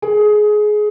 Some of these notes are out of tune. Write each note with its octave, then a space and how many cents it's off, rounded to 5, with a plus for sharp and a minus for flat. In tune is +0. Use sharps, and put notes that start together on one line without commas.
G#4 +20